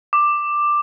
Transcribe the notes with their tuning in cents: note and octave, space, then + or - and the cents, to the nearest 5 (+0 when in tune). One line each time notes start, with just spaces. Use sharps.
D6 +10